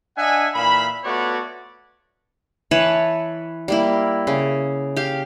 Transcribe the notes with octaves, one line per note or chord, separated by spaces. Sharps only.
D4 D#5 E5 F#5 G#5
A#2 E3 E5 F5 B5
A3 B3 F4 F#4 C#5 D5
E3 B4 C#5 A5
G3 A#3 E4
C#3
G4 F5